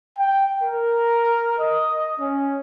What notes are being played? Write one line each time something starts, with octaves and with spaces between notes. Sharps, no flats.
G5
A#4
D#5
C#4